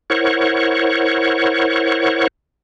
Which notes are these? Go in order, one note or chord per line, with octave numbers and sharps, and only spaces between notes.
E4 A#4 C5 C#5 F#5 C#6